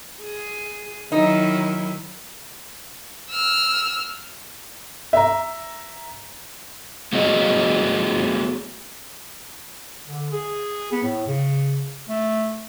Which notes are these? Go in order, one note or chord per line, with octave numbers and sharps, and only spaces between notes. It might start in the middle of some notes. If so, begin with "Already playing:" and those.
G#4
D#3 F#3 D#4 E4
E6 F6
E5 A#5
A3 B3 F#4 G#4 D#5
D3
G#4
B3
A2
C#3
A3